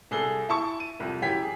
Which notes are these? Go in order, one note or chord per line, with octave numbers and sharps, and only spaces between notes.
C2 G#4 A4 G7
E4 A5 C#6
D#7
C2 F2 F3
F#2 E3 G4 G#6 B6
G#4